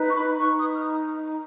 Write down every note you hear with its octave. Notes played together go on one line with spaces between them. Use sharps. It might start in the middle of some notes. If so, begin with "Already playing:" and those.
Already playing: D#4 B4
C#6
B5
D#4 C#6
D#6
F6